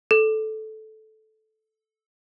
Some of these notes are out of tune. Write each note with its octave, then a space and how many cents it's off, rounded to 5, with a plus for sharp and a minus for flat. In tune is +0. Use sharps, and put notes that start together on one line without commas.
A4 -15